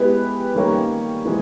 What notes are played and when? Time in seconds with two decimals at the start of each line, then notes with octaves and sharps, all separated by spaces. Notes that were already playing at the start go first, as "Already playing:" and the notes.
Already playing: G#3 B3 E4 G4 B4
0.55 D#3 G3 A#3 C#4
1.25 E3 G#3 C4